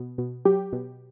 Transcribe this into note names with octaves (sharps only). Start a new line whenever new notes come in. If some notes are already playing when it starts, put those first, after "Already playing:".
Already playing: B2
B2
F#3 G4
B2